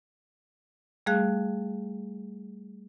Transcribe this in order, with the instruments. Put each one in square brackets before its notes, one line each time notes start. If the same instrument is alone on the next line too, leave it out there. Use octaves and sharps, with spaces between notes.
[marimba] G3 A3 G#4 F5 F#6